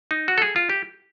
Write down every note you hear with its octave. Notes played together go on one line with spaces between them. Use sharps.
D#4
F#4
A4
G#4
F4
G4